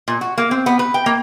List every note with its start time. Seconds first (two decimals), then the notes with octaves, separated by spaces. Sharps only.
0.08 A#2
0.21 F#4
0.38 A#3
0.51 C4
0.66 B3
0.79 B4
0.94 G5
1.06 A#3